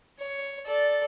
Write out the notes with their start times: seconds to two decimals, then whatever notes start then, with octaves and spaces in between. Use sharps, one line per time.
0.19 C#5
0.66 A4 D5